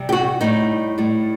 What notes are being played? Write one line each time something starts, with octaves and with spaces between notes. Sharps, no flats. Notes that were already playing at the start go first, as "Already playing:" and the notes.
Already playing: C3 G3
G4
F#4
A2 G3 D#4
A2 G3